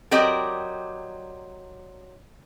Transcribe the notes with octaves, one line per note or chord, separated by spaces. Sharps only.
F#3 C4 G4 A#4 D5 D#5